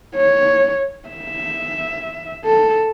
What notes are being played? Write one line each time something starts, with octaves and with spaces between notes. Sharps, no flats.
C#5
E5
A4